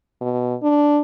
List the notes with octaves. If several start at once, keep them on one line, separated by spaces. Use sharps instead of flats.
B2
D4